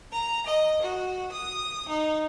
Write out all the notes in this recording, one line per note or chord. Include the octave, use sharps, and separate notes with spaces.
A#5
D#5
F#4
D#6
D#4